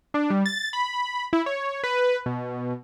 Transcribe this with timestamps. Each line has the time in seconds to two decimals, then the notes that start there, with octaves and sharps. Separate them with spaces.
0.14 D4
0.30 G3
0.46 A6
0.73 B5
1.33 E4
1.46 C#5
1.84 B4
2.26 B2